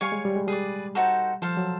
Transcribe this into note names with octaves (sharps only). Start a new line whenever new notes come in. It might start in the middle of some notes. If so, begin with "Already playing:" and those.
G3 C#5 F5 G#5 C#6
G#3
G3
G#3
G3 G#4 B4 D5
D#4 F#4 A4 C5
F3 A4 C5 F5
F#3